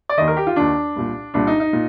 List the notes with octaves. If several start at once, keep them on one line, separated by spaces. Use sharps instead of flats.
D5
D#2 D#3 D#5
A#4
G4
F4
D#2 D#3 D4
C2 A#2
C2 A#2 D4
D#4
D#4
A#2